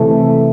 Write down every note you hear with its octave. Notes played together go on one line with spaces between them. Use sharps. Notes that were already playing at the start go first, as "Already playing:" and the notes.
Already playing: C3 E3 A3